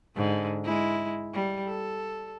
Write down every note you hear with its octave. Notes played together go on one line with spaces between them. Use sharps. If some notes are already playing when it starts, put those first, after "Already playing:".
G#2 D3
G#3 E4
G3
A4